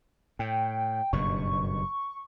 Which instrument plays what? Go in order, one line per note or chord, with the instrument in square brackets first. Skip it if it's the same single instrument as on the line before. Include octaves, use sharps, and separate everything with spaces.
[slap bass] A2 [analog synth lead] G5
[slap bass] F#1 G2 B2 [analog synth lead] C#6